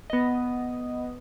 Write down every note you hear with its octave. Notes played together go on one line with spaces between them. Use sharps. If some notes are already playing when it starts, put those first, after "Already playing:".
B3 D#5